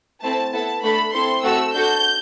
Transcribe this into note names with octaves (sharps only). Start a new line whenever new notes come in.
A3 C4 E4 A5
B3 E4 A4 A5
A3 D4 A4 B5
C4 E4 A4 C6
A3 C4 F#4 A4 E6
D4 F#4 A4 G6